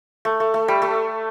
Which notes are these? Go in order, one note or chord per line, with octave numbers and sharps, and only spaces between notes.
A3
A3
A3
G3
A3